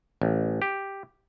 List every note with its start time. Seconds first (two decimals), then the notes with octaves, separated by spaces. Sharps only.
0.22 A1
0.62 G4